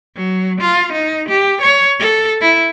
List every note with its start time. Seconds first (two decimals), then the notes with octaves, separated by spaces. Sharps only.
0.16 F#3
0.61 F4
0.93 D#4
1.29 G4
1.62 C#5
2.00 A4
2.41 E4